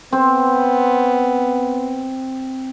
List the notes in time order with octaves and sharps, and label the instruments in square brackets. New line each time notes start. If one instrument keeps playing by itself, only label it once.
[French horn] B3 [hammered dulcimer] C4